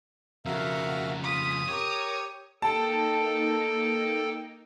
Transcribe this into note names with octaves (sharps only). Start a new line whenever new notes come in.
F2 C#3 F#4 A#4 E5 F5
F4 D#6 B6
G4 A#4 C#5
A#3 D#4 A4 G5 A5